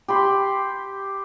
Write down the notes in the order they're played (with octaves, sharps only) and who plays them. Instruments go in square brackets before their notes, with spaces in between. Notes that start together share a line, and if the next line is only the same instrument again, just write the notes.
[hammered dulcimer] G4 B5 C6